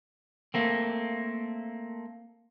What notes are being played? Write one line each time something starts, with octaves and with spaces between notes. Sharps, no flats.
A3 A#3 C4